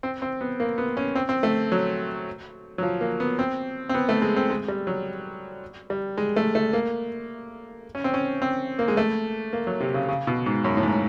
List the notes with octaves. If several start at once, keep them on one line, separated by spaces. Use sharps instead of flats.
C4
C4
B3
A#3
B3
C#4
C4
C4
A3
F#3
F#3
F3
A#3
B3
C4
C4
B3
A3
G#3
C4
G#3
G3
F#3
G3
G#3
A3
A3
A#3
C#4
C4
C#4
C4
A#3
G#3
A3
A#3
F#3
C3
C#3
C#3
B2
G#2
F#2
A2
G#2